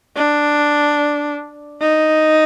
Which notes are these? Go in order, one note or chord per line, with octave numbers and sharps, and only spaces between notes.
D4
D#4